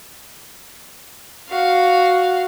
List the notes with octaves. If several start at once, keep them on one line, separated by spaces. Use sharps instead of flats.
F#4 F5